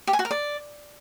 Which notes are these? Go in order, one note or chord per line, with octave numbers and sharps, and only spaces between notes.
G4
G#5
F#4
A#4
D5